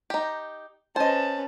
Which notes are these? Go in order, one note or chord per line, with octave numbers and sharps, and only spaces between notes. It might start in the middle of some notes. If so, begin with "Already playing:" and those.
D#4 G4
C#4 B4 C5 D#5 A5